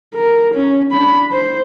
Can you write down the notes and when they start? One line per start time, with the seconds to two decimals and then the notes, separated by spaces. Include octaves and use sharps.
0.14 A#4
0.54 C#4
0.92 D4 B5
1.32 C5